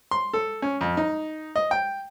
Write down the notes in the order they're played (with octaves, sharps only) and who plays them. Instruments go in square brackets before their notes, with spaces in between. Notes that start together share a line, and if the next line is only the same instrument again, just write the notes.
[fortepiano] C6
A4
C#4
F2
D#4
D#5
G5